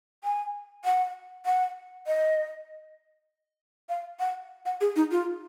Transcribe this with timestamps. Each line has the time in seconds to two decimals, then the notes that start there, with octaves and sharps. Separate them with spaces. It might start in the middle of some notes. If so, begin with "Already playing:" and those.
0.24 G#5
0.85 F#5
1.46 F#5
2.07 D#5
3.89 F5
4.20 F#5
4.66 F#5
4.81 G#4
4.96 D#4
5.11 F4